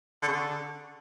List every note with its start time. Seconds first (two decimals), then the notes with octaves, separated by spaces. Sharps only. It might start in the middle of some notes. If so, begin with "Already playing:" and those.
0.22 D3
0.27 C#3
0.32 D3